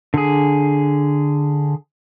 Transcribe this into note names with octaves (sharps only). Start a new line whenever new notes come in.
D3 G#4